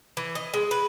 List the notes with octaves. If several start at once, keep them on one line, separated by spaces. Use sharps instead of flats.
E3
D#5
G#3
B4